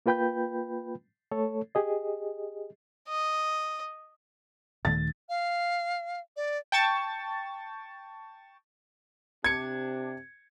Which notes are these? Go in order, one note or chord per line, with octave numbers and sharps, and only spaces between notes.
A#3 F4 B4 G5 B5 G6
A3 A4 C#5
G4 G#4 D#5
D#5
D#1 D#3 A3 A6
F5
D5
G5 A5 C#6 A6
C3 D4 G#6 C#7